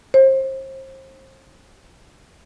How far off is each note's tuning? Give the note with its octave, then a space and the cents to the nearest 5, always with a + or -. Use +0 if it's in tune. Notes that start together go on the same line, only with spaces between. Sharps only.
C5 +30